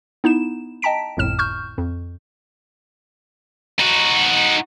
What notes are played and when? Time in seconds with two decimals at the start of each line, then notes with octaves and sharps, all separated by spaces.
0.24 B3 D#4 E4 E7
0.82 D#5 G5 A5 A#5 B6 D7
1.17 G1 C2 F2 A2 F6 E7
1.39 C#6 F6 G6
1.78 F2
3.80 D#4 F#4